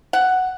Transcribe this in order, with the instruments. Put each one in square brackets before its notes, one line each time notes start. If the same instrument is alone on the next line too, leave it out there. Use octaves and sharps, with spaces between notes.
[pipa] F#5